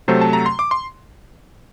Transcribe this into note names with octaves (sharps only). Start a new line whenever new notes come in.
C3 F#3 A3 C5
A5
A#5
C6
D6
C6